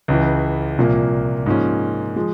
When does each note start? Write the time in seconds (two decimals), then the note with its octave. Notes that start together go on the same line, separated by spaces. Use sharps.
0.08 C#2 C#3 E3
0.78 C2 A#2 F3 A#3
1.46 G#2 F3 A#3 C#4
2.16 F3 G#3